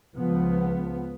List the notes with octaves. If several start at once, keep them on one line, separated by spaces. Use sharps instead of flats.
C#2 F3 B3